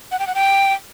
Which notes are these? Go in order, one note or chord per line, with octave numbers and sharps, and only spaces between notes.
F#5
G5
F#5
G5